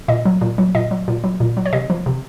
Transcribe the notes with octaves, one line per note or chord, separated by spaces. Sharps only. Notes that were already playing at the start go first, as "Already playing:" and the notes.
A#2 D#5
F#3
A#2
F#3
A#2 D#5
F#3
A#2
F#3
A#2
F#3
C#5
C3 D#5
F3
C3